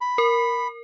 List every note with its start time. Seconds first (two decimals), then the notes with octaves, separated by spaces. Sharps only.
0.01 B5
0.18 A#4